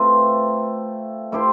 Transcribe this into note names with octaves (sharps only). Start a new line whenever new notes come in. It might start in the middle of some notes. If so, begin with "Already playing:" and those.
Already playing: A3 C4 F4 B4
A3 E4 G4 C5